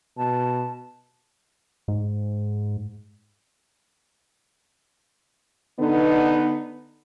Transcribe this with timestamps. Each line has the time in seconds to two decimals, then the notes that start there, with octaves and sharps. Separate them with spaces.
0.17 B2 A5
1.88 G#2
5.79 D3 B3 D#4